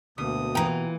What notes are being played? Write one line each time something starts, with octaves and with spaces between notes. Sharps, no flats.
D2 B2 D3 A#3 D#6
A#2 E3 G5 A#5